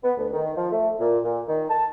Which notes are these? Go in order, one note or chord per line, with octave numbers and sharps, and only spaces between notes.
B3
D2
D#3
F3
A3
A#2
A#2
D#3
A5